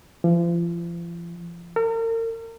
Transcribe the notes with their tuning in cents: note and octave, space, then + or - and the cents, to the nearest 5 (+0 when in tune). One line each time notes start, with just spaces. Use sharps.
F3 -40
A#4 -40